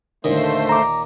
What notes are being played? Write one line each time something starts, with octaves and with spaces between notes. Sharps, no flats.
D#2 A#2 D3 D#3 A3 C5
A#5 D6